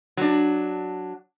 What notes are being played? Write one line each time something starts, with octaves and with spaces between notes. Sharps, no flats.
F#3 D4